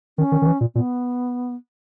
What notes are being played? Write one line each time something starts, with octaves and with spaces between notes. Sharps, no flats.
D#3 C#4
D#3
D#3
E3
A#2
A#2 B3